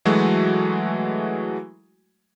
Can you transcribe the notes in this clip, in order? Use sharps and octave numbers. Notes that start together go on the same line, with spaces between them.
E3 F#3 G#3 A3 F#4